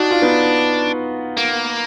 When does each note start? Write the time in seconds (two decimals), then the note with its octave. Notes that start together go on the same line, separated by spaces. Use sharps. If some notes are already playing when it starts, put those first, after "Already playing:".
Already playing: D4 D#4 F#4
0.11 F4
0.22 B3 D#4
1.37 A#3